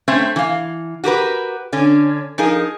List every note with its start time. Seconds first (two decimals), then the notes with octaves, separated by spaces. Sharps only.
0.08 A3 C4 C#4 C5 E5
0.36 E3 F5
1.04 F#4 G4 A#4 B4
1.73 D3 C#4
2.38 F3 D#4 G#4 A#4